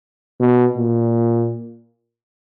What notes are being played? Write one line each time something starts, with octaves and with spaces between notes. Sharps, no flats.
B2
A#2